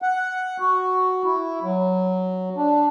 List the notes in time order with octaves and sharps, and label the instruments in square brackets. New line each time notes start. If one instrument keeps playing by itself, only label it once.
[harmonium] F#5
F#4
E4
F#3
D4